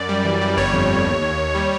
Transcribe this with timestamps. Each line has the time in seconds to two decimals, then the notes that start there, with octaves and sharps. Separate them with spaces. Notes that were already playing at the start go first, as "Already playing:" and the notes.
Already playing: F#2 D5
0.09 G3
0.25 E3
0.41 G3
0.57 G1 C#5
0.73 F2
0.89 G1
1.06 D#2
1.22 D#2
1.38 D#2
1.54 G3